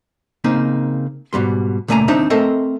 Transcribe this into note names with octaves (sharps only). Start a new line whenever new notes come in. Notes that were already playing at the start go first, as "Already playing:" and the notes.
C#3 A#3 C4 D#4
G#2 B2 G3 C6
C#2 A#2 A3 A#3 G#5 A#5
D#2 C4 D4 D#4 E5 A#5
A3 C4 A4 A#4 D#5 E5